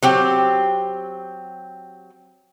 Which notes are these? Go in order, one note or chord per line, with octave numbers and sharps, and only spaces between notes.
F#3 C4 G4